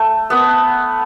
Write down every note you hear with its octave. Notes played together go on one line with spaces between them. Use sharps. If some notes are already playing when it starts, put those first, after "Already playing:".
Already playing: A3
B3